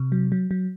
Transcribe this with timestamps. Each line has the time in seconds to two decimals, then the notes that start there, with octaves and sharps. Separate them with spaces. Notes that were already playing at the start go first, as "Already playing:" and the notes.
Already playing: C3
0.12 F#3
0.32 F#3
0.51 F#3